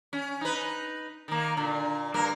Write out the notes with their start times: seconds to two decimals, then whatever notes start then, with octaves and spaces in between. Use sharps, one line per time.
0.13 C#4
0.41 D#4 B4
1.28 D#3 A#3
1.57 A#2 D3
2.14 G2 A#3 A#4